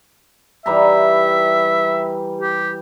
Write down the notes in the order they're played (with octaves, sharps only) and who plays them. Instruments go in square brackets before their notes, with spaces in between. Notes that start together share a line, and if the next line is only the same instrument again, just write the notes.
[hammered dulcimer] E3 G3 A#5 [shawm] E5
[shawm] G4